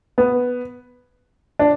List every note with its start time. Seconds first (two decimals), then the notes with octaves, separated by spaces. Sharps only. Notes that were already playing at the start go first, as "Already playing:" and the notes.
0.18 B3
1.59 D4